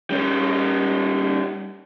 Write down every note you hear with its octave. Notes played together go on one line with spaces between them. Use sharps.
G3 C#4